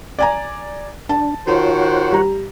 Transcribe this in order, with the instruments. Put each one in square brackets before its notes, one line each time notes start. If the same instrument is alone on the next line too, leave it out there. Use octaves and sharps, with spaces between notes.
[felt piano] D5 G#5 A#5
[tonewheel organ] D4 [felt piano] A5
[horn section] D#3 F#4 C5 [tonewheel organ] F4 C#5 F#5
[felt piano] G3 A#5